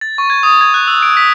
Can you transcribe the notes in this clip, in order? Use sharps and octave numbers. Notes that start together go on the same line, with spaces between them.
A6
C#6
G#6
D#6
G#6
F#6
E6
D7
B6